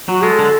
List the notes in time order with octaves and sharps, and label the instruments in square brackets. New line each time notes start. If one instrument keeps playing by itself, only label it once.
[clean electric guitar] F#3 [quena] F#4
[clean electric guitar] G#3 [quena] A4
[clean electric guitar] D3